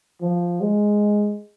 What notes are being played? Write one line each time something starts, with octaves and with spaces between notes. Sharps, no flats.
F3
G#3